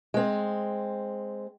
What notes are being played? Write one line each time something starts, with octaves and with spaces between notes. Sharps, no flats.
G#3 C4